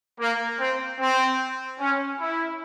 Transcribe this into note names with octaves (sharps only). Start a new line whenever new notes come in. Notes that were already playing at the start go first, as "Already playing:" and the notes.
A#3
C4
C4
C#4
E4